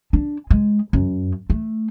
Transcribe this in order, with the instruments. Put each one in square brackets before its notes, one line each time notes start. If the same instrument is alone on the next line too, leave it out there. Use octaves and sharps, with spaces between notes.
[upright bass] D4
G#3
F#2
A3